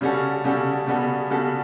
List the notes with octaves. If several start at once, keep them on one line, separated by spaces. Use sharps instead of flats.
C#3 G3 C#4 F#4 A4
C#3 G3 C#4 F#4 A4
C#3 G3 B3 F#4 A4
C#3 G3 B3 F#4 A4